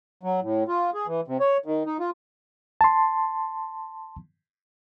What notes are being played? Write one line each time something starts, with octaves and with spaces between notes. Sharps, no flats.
F#3
A2
F4
G#4
E3
C3
C#5
D#3
D#4
F4
A5 C6